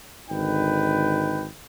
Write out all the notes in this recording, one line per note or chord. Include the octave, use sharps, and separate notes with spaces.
G#1 D3 D#4 B4 G5